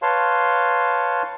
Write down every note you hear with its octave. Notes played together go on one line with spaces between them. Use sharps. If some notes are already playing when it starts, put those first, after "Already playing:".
B4 C#5 F5 A5 C6